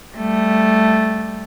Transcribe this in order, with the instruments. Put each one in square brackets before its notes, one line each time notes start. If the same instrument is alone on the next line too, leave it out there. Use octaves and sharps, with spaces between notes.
[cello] G3 A3